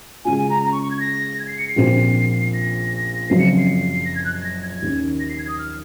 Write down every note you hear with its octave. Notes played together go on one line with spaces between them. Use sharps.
C#3 G#3 C#4 F4 G#5
G#5
A#5
A#5
C#6
C#6
G#6
A#6
G#6
C7
C#7
C7
A#1 A#2 F3 C4
A#6
F#1 F#2 F3 C4 C7
C#7
C7
A#6
G#6
F#6
G#6
A#6
G#6
D#2 D#3 A#3 C#4
A#6
C7
G#6
D#6
F6